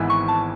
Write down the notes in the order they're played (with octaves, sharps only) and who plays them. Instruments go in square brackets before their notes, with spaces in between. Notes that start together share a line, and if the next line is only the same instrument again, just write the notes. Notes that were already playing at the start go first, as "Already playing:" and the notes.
Already playing: [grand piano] G#1 G#2 E3 B3 E4
[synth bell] C#6
A5